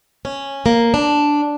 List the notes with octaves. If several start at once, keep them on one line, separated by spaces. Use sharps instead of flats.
C#4
A#3
D4